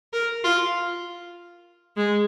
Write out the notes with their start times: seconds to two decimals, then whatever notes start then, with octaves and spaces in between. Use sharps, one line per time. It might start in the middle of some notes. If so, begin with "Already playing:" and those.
0.13 A#4
0.44 F4
1.97 G#3